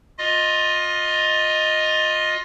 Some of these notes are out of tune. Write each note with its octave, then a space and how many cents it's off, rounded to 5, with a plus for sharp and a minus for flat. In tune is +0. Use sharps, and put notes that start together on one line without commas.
F4 +20 D#5 +0